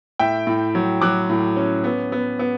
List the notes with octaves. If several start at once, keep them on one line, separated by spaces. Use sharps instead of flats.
A2 E5 G5
A2
F#3
F#3 D6 F#6
A2
C#4
B3
B3
B3